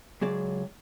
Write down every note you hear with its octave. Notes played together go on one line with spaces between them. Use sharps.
C#2 F#3 G#4 D5